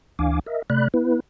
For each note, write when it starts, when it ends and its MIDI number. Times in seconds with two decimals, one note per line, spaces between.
0.19 0.39 38
0.19 0.39 52
0.19 0.39 62
0.19 0.39 77
0.19 0.39 80
0.19 0.39 86
0.46 0.62 70
0.46 0.62 75
0.46 0.62 76
0.70 0.88 48
0.70 0.88 57
0.70 0.88 74
0.70 0.88 83
0.70 0.88 90
0.94 1.20 59
0.94 1.20 64
0.94 1.20 71